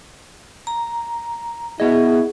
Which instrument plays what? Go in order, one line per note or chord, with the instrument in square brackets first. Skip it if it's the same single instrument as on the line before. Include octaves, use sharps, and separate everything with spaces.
[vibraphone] A#5
[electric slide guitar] B3 D#5 [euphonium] E4 [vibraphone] G#4